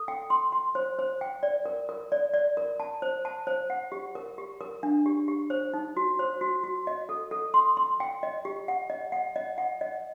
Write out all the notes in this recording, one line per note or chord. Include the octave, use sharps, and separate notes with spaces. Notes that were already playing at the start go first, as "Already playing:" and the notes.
Already playing: A4
G5
C6
C6
C5
C5
G5
D5
A#4
A#4
D5
D5
A#4
A5
C5
A5
C5
F#5
G4
A#4
G4
A#4
D4
G4
G4
C5
D#4
F#4
C5
F#4
F#4
D#5
A4
A4
C6
C6
G5
D#5
G4
F#5
D#5
F#5
D#5
F#5
D#5